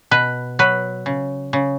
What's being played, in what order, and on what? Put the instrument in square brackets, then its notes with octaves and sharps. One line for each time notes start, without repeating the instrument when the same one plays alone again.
[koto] B2 B4
F#3 B4
C#3
C#3